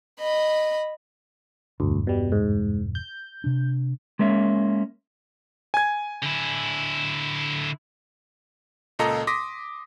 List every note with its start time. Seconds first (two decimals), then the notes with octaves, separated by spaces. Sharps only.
0.19 D#5 B5
1.80 E1 D2 G2
2.07 B2 G3
2.32 G#2
2.95 G6
3.44 C3 D4
4.19 G#3 A#3 C#4 E5
5.74 G#5 G#6
6.23 D3 E4
8.99 C#2 A#2 A4 D#5 A#5
9.27 C6 D6 D#6 A#6 B6